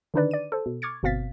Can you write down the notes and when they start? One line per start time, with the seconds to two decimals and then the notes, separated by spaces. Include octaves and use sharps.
0.14 D3 D#3 D4 D#4 B4 D5
0.31 D5 D#7
0.52 A4 C5
0.66 B2
0.82 C#6 D6 F6 G#6 A6 C#7
1.03 G1 B2 C4 F5 A6 B6